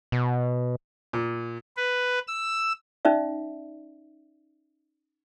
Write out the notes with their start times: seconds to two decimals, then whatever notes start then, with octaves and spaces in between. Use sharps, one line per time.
0.12 B2
1.13 A#2
1.77 B4
2.27 E6
3.05 C#4 D#4 D5 E5